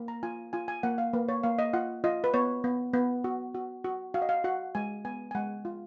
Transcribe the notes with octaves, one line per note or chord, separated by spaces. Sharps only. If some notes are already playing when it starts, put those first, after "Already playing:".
Already playing: A#3
A#5
F4 G#5
F4 G#5
G#5
A#3 F#5
F5
A#3 B4
C#5
A#3 F5
D#5
F4 F#5
F4 D#5
B4
B3 C#5
B3
B3
F#4
F#4
F#4
F#4 F5
D#5
F5
F#4 F#5
G#3 G#5
B3 G#5
G#5
G#3 F#5
F4